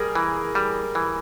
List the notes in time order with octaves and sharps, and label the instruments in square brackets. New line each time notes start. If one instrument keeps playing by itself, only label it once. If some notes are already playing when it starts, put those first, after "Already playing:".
Already playing: [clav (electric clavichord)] G3 [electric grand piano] G#4 A#4
[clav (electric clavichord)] E3
G3
E3